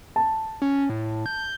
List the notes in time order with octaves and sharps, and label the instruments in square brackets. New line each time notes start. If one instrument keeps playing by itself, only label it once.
[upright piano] A5
[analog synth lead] C#4
A2
G6